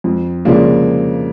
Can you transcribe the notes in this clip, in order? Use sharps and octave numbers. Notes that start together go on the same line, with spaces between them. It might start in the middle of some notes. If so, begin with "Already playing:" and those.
F2
C#3 F3 A#3 D4